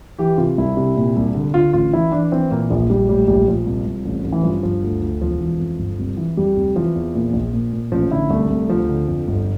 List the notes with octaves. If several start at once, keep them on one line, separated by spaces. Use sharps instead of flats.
E3 G4
C3 F4
C2 E4
C3
A#2
C2
D3
D3 F4
A1 F4
E3 E4
E3 D4
E3 C4
A#2 A#3
A#1 F3
A#1 G3
A2 G3
A#1 G3
A#1 F3
C2
C2
A1
A1
E3
G2 F3
G1 F3
D2
D2
E1 F3
E3
F2
G1
C2
E3
F2 G3
F1
E3 F3
E2
A#2
A#1
A#2
A#2
A1 F3
D3 E4
C2 A3
C2
D2 F3
D3
F2
G1